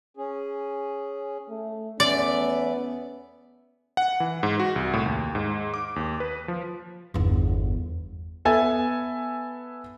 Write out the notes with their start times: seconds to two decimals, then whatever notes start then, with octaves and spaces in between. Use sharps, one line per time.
0.17 C#4 G#4
1.49 A3
2.00 E2 A3 B3 C#4 D5 E5
3.97 F#5
4.20 E3
4.43 G#2
4.60 F#4
4.76 C2
4.93 A2
5.06 D#2
5.35 G#2
5.74 D6
5.96 D#2
6.20 B4
6.48 F3
7.14 G1 E2
8.45 B3 A4 E5 G#5